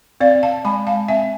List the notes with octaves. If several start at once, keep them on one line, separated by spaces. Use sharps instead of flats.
C4 D5 F5
F5 A5
G#3 G#5 B5
F5 A5
C4 E5 G#5